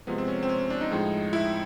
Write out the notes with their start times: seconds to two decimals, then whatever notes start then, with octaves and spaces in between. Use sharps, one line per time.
0.07 C3 F3 G#3 B3
0.18 C4
0.28 C#4
0.43 C4
0.49 C#4
0.70 D4
0.81 D#4
0.91 A2 F3 G#3
1.33 E4